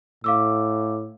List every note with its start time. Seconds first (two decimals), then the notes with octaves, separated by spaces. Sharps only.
0.24 A2 F5 D6 E6